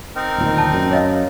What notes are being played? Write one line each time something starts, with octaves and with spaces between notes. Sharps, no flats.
C4 D#4 A#4
D1 A#2 D#3
A5
F#2
C#5 D#5 F5